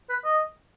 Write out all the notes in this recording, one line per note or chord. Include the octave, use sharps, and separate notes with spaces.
B4
D#5